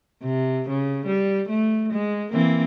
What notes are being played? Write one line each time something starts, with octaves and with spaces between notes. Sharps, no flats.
C3
C#3
G3
A3
G#3
E3 A#3 C4